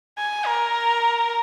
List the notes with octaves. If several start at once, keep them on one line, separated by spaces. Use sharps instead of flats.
G#5
A#4